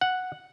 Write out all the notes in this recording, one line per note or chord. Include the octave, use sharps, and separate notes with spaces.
F#5